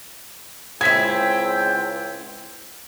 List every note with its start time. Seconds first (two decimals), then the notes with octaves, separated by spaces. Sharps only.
0.81 C#2 C4 E4 G5 G#6 B6